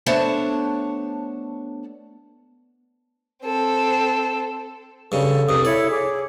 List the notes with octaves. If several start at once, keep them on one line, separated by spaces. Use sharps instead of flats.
A3 B3 D4 C5 C#5 A5
C4 A4
G2 C#3 A4
C2 G2 D#6
E4 C#5 D5
G#4 C#5 D6